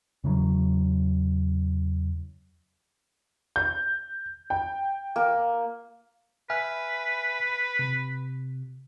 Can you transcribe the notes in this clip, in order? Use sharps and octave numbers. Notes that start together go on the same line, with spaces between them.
E2 C#3 E3 F#3
G6
G5
A#3
B4 E5 G#5 F6
C3